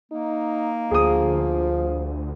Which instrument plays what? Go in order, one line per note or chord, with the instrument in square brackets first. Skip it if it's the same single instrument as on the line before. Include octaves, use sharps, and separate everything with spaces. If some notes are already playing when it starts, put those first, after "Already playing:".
[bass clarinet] A#3 [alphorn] D#4
[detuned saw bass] D2 [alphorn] F3 [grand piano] G#4 D#6